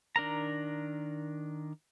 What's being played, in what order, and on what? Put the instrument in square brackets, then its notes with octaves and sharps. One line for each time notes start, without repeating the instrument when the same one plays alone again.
[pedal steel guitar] D#3 D4 A#4 A#5